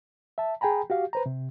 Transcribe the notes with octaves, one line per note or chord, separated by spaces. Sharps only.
E5 A5
G#4 G5 G#5 A#5 B5
F#4 G4 F5
B4 C5 A#5
C3